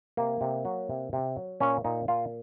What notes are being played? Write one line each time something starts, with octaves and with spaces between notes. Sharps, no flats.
C3 A#3
C3
F#3
C3
C3
F#3
A#2 C#4
A#2 D#4
A#2 F4